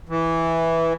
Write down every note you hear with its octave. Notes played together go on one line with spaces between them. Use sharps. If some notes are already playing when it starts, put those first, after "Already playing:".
E3